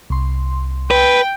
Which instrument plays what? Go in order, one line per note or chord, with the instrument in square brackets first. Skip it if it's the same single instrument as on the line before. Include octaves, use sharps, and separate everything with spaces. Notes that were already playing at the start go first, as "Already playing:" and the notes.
[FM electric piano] C2 C6
[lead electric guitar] B4 [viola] G5